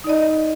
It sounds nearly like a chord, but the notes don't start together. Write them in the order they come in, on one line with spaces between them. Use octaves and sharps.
D#4 D5 D#5